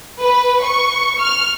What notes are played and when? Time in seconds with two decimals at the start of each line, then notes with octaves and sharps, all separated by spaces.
0.23 B4
0.64 C#6
1.20 F6